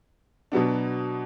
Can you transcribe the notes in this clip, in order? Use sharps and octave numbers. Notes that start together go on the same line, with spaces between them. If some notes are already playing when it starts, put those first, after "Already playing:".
B2 F#3 B3 D4